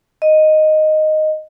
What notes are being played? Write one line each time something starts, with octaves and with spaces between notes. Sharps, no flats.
D#5